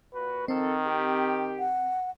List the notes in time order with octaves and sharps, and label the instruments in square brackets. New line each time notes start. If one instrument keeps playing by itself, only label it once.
[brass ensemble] A#2 F#4 [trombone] B4
[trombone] D#3 [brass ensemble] F3 A4 [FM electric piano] C4
[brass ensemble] G4
[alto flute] F#5